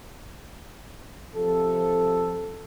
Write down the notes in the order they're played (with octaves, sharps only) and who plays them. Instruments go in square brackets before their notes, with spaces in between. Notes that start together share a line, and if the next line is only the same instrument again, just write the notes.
[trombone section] C3 F3 A4